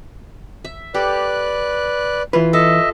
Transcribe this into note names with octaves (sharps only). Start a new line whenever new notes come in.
E5
G4 A4 B4 D5 F#6
E3 F4 B4
A4 D#5 E5